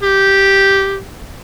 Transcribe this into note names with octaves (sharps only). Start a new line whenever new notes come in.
G4